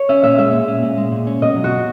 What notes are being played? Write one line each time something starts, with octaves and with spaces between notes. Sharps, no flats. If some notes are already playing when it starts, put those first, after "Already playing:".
Already playing: C#5
C#4 E5
A#2 E5
G#3 E5
A#2
C#4
A#2
G#3
A#2
C#4
B2 D#5
F#3
F#4
B2